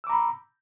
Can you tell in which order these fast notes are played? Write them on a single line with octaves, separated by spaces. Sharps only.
E6 D6 A#5 B5